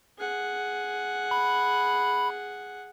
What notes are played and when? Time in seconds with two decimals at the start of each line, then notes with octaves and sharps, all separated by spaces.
0.18 G#4 F#5
1.31 B5